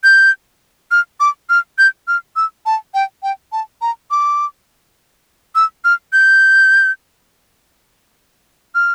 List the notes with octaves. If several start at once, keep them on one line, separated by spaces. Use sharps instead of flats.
G6
F6
D6
F6
G6
F6
E6
A5
G5
G5
A5
A#5
D6
E6
F6
G6
F6